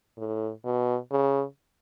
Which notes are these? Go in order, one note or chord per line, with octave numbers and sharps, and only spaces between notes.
A2
B2
C#3